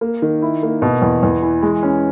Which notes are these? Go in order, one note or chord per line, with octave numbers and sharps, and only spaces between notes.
A#3
D#3
E4
A#3
B2
E2
E2
E3
G#3
C#4